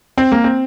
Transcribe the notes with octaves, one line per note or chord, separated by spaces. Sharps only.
C4
A#3
C4